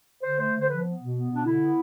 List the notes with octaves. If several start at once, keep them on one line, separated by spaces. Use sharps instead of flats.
D3 C5
A3 C5
D3
C5
F3 B4
B3
B2
B3
B2 D4
D3 E4
B3